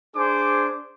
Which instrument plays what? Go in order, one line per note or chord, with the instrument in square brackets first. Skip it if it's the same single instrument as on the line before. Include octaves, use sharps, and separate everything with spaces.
[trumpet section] D4 G#4 C5 D6